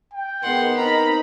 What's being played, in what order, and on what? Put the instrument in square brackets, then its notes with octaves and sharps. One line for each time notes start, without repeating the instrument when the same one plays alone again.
[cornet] G5
[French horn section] G#2 D#3 [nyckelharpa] B3 [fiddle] F#5 C6
[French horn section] C4 D#4 [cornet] A#4 [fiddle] A#5 B5